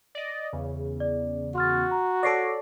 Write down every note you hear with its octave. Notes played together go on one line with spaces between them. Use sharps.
D5 D#5
E2 C#3
D5
F#4 C6 F6 A6
A#5
A4 C#5 D5 A#6 C7 D7